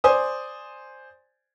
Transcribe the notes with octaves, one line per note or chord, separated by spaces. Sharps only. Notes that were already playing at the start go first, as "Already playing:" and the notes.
C5 D5 G#5 D#6